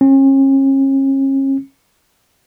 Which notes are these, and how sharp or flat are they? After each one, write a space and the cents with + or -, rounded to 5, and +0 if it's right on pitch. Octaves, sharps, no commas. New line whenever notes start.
C#4 -40